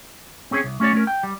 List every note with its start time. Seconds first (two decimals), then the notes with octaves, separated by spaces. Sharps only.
0.51 C4 C#4 G#4 C5 C#5
0.64 C2
0.80 A3 C#4 F#4 C#5 D5
0.93 A3 C#4 A#4
1.07 G5
1.23 G3